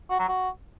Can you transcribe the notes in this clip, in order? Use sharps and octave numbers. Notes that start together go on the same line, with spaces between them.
F#4
F#3
F#4